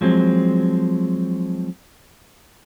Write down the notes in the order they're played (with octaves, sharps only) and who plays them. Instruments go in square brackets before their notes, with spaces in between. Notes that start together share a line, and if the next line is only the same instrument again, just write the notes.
[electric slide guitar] F3 F#3 G#3 C4